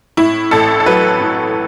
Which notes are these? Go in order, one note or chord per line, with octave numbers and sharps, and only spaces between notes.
A2 E4
A1 A4
A4
F#3 B4
A2